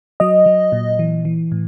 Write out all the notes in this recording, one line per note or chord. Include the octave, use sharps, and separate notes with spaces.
F#3 D#5
F#3
A#2
E3
E3
A2